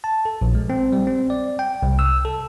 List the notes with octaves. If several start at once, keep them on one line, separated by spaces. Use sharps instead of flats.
A5
A4
A#1
G#3
C4
G3
C4
D5
G5
C2
E6
A4